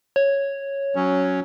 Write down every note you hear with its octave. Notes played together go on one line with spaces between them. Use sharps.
C#5
F#3 C#4